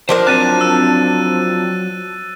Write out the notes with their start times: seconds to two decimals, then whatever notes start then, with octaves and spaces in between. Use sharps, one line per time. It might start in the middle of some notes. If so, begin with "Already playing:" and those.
0.09 F3 D4 A#4 C5
0.27 F#3 C4 A5 F#6 A6 D#7
0.61 E6